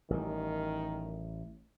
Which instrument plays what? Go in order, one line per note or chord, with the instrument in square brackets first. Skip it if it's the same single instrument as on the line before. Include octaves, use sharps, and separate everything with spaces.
[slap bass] A1 G3 [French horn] D#3